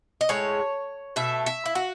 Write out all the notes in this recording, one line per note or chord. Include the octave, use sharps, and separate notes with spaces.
D#5
A2 G#3 C#5
B2 A3 E5
E5
E4
F#4